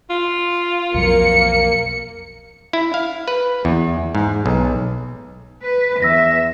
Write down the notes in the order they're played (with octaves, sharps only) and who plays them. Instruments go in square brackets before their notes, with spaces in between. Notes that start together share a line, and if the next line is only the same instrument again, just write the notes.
[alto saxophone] F4
[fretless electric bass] B1 F2 F#3 [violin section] A#3 C#7
[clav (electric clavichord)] E4
F5
B4
E2
G#2
B1
[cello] B4
[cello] E2 E5 [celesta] E6 A#6 B6